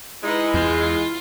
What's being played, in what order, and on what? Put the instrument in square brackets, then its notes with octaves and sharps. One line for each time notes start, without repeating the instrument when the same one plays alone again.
[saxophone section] G#3 [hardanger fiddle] D#4 B4 [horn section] E4
[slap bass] E2 [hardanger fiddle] F4